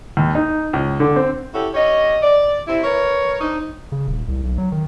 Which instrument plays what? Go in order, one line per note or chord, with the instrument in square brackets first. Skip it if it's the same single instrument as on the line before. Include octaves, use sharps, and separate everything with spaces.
[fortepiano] D#2
D#4
C#2
D3
C4
[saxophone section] C#4 E4 F#4 G4 A4
C#4 G4 C#5 D#5
D5
C3 C4 E4
A#4 B4 C#5
C4 D4 D#4
[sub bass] C#3
D#1
C2
B1
F#3
D#3